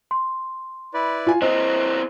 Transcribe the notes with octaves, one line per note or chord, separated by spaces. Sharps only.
C6
E4 B4 D5
F4 G#5
E3 C4 C5 D#5 A#5